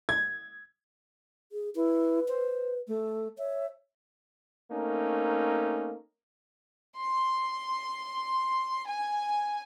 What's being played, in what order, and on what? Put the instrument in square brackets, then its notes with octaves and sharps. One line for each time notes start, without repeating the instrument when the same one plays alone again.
[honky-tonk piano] G#6
[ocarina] G#4
[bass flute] E4 [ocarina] B4
[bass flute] C5
A3
[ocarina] C#5 [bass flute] E5
[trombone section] A3 A#3 C4 C#4 D#4 A#4
[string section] C6
G#5